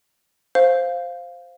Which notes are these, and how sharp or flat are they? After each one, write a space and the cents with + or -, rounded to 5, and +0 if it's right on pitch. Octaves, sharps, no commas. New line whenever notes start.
C5 +0 F5 +0